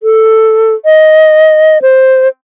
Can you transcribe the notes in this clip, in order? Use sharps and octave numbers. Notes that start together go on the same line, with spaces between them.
A4
D#5
C5